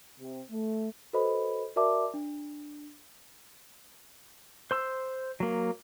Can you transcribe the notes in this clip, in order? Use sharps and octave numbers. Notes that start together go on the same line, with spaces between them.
C3
A3
F#4 A4 B4 C5 D#5 B5
F#4 A#4 D5 E5 A5 D6
D4
C5 C6 E6
F#3 A#3